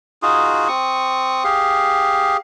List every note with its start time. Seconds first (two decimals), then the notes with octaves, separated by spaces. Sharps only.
0.22 D#4 F4 F#4 G#4
0.68 C4 C#6 D#6
1.44 G4 G#4 F5